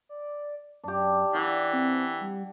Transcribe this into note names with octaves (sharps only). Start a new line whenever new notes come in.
D5
F#2 D4 G4
E3 D5 F#5 G5
C4
G3